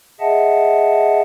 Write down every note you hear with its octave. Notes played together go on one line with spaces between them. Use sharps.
G#4 D#5 E5 F#5 A5